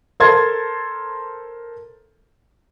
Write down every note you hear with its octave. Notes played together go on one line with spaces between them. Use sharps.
A4 A#4 C5 C6 G#6 A6